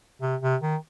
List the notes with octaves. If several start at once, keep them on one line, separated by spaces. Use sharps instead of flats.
C3
C3
D#3